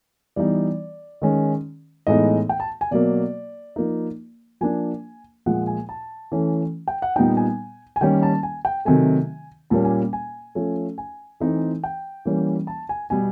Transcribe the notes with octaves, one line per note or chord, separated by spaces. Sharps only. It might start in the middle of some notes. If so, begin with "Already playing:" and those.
E3 G3 B3 D#4 D5
D#3 G#3 C#4
A2 E3 G#3 B3 D#4 D#5
G5
A5
G#5
B2 F#3 A#3 D5
F3 A#3 D#4
F3 A#3 D4 G#5
A#2 F3 G#3 F#5
G#5
A5
E3 A3 C#4
G5
F#5
A#2 G3 B3 D#4 G5
G#5
G#5
D#3 G3 A#3 C#4 G5
A5
G#5
G5
C3 D#3 F#3 A3 G#5
A#2 G3 A#3 C#4 A5
G#5
G#5
F3 A3 C#4
G#5
E3 A3 C4 D#4
G5
E3 G3 A#3 C#4
A5
G#5
B2 G3 B3 G#5